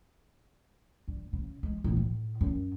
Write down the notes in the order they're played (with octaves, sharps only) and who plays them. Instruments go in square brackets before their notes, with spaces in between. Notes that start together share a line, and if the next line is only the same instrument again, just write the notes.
[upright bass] G2
C#3
G#3
A1
A2
F#2